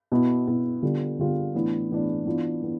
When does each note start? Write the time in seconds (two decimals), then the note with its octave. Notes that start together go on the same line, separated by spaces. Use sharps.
0.12 B2 B3 E4
0.47 B2 B3 E4
0.82 D3 G3 B3 F4
1.19 D3 G3 B3 F4
1.54 A2 E3 B3 D4
1.91 A2 E3 B3 D4
2.26 E3 B3 D4 F4
2.62 E3 B3